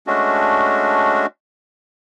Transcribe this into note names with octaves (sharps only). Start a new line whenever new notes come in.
G#3 A3 C#4 D4 F#4